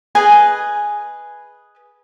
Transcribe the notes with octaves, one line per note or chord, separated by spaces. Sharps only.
G#4 B4 D#5 G#5